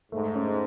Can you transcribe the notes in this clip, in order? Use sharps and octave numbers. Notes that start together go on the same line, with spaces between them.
G#2 A3
C#4